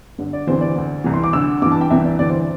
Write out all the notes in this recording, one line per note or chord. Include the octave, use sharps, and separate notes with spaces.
G2 D3
D5
D2 C3 E3 C5
D5
D2 D3
C2 C3 E3
C6
D6
D2 D3 E6
G2 E3 D6
A5
G5
C2 C3 E3 E5
D5
D2 C3 E3 D5
C5